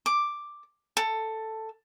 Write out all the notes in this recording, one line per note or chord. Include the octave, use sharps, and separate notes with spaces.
D6
A4